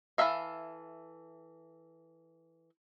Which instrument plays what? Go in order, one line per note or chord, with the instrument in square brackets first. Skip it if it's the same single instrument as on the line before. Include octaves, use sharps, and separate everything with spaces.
[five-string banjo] E3 E4 A4 E5 F5